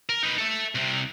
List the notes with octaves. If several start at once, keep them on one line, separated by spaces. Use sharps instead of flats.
A#4
D#4 B4
A4 E5
C2 C3